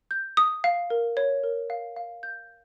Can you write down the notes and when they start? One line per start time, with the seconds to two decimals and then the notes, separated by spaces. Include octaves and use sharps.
0.11 G6
0.37 D#6
0.64 F5
0.90 A#4
1.17 C#5
1.44 A#4
1.70 F5
1.96 F5
2.23 G6